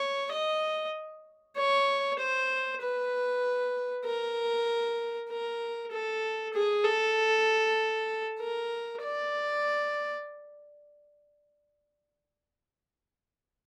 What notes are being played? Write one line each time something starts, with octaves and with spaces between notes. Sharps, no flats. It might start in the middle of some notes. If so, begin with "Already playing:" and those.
Already playing: C#5
D#5
C#5
C5
B4
A#4
A#4
A4
G#4
A4
A#4
D5